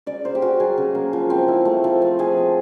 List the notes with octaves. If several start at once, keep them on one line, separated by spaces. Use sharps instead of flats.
C#3 D5
A#3 C5
G4
C#4 F#4
F#3 G#4
C#3
A#3
F3
C4
E4
A3
F3
C4
F3 G#4
B3